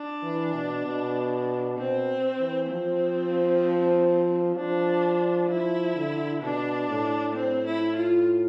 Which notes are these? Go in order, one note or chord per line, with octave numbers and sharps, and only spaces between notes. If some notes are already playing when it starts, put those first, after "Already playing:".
Already playing: D4
E3
B2
B2
B2 C4
E3
F3 C4
F3 D4
F3 E4
D3
B2 D4
A2
C4
E4
F4